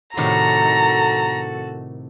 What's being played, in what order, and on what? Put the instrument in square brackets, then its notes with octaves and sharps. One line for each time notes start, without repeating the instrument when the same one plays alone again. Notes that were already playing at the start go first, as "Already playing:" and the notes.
[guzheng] A2 C3 D#3 [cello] F#4 A4 [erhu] A#5